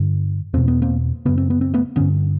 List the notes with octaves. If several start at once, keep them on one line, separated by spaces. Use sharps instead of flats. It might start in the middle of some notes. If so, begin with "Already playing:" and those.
Already playing: G2 D3
E2 B2 C4
B3
A#3 C4
F#2 C#3 B3
C4
B3
C4
A3 B3
G2 D3 B3 C#4